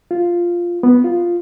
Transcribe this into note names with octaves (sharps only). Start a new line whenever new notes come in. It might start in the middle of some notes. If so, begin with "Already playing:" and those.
F4
B3
F4